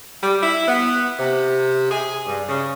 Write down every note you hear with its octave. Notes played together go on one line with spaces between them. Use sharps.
G3
E4
B3
C3
G#4
G2
C#3